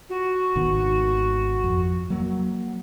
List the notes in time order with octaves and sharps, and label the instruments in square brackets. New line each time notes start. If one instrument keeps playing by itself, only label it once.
[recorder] F#4
[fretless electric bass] G#1 B2 D#3
F2
F#3 A#3